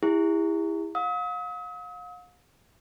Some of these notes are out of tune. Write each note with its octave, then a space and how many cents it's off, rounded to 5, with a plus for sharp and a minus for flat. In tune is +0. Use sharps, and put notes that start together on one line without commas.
E4 +0 G#4 -45
F5 +40 D#6 +45